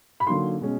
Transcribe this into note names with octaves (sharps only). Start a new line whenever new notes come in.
B5
D3 F#3 A#3 D#4 C6
B2 G#3 C#4